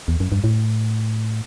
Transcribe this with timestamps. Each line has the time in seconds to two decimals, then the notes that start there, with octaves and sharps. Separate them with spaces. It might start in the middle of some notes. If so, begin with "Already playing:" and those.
0.08 E2
0.20 F#2
0.32 G2
0.44 A2